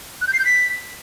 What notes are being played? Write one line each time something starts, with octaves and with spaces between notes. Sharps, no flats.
F#6
G6
C7
G6
B6